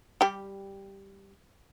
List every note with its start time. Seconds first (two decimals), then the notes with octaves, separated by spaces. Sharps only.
0.21 G3 G4